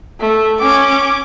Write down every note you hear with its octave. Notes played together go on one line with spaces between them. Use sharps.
A3
C#4 D6